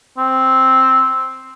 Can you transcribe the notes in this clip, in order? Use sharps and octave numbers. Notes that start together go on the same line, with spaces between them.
C4